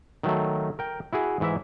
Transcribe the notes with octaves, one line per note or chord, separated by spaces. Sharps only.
D#3 F#3 A3
A#4 G5
E4 F#4 G#4
G#2 E3 E4 E5